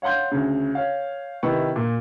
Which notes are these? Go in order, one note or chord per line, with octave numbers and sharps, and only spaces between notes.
C#5 F5 F#5 C6 G6
D2 C#3
C#5 F5
C3 D#3 E4 B4 C#6
A#2